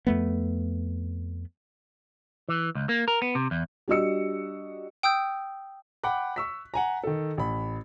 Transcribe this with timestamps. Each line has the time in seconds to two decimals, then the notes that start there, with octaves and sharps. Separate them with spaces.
0.07 F2 A3 B3
2.49 E3
2.75 C#2
2.89 A#3
3.08 A#4
3.22 B3
3.35 C3
3.51 E2
3.88 G3 D4 F#4 D#5 E6 C#7
5.03 G5 D#6 E6 G6
6.04 F#5 G5 B5 D6 F#6
6.36 C#6 E6 B6
6.74 F#5 G#5 A#5
7.04 D#3 A4
7.38 A1 B5